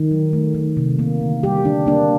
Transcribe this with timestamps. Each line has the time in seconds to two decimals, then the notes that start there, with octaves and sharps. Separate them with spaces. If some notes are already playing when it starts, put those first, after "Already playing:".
Already playing: D#3
0.11 F#3
0.33 A3
0.55 D#3
0.77 C3
0.99 A#3
1.21 D3
1.43 G3 G4
1.65 D3 D4
1.86 A#3 D4